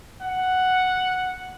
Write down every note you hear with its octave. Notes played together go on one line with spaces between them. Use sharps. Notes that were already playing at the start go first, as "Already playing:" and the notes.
F#5